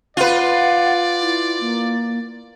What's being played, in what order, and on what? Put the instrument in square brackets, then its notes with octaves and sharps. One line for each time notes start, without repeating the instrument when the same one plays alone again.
[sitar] F4 B4 [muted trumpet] D5 [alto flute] F#5
[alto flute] E4
A#3